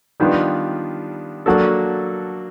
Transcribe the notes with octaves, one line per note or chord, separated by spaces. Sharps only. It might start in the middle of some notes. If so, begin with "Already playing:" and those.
D#3 G3 B3 D4 F4
F#3 A#3 D4 F#4 A4